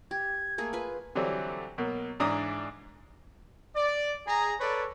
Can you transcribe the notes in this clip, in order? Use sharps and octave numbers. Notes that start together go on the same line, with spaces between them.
G4 G#6
A3 A#3 G#4
F4 B4 G#5
D3 E3 F#3 G3 C4 D4
B2 F#3 A#3
G#2 E3 D4 A#5 D#6
D5
G#4 A#5
A4 B4 C#5 D5